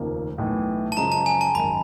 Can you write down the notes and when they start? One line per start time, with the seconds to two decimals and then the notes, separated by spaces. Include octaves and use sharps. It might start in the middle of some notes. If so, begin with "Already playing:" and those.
Already playing: F1 D#2 C#3 F3 A#3
0.38 B1 A2 E3
0.92 A5
0.97 F#2 C#3 F3 G#3 A#5
1.12 A5
1.26 G#5
1.41 A5
1.55 G#1 F#2 D#3 G#3 B5